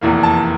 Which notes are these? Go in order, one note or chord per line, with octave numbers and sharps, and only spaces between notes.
F1 E2 E3 A#3
A5